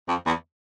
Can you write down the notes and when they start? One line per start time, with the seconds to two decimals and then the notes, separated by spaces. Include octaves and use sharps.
0.08 F2
0.26 E2